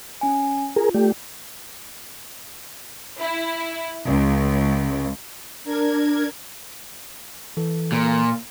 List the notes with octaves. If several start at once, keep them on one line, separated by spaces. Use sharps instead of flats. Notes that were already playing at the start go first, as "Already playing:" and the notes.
C#4 G#5
F4 G#4 A#4
A3 G4 D5
E4
C#2
D4 A#4 G#6
E3 A4
A#2